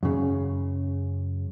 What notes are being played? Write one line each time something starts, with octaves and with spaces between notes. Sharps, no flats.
F#2 C#3